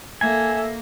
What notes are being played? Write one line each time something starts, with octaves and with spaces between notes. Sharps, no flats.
A#3 A4 E5 G#5